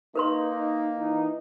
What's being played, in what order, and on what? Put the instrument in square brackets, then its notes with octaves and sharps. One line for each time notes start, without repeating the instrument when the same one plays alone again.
[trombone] A#3 [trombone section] D#4 [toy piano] A#4 B4 C6
[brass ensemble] E3 D#4